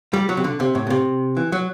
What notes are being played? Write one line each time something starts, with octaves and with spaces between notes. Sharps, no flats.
G3
F#3
C3
D3
C3
A2
B2
C3
E3
F#3